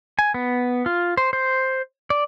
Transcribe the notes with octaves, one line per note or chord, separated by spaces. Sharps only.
G#5
B3
F4
C5
C5
D5